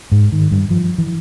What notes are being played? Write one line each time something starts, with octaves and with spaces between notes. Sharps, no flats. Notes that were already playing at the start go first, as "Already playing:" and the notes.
G#2
D#3
G2
F3
E3